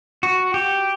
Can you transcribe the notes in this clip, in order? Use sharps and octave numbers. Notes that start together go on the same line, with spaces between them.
F#4
G4